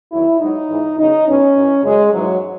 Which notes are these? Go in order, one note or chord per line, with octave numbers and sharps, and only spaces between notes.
E2 D#3 F#3 E4
G#2 F#3 D#4
G#2 E3
E2 C#3 F#3 D#4
E2 B2 F#3 C#4
F#2 E3
F#2 C#3 F#3 G#3
G#2 E3 F#3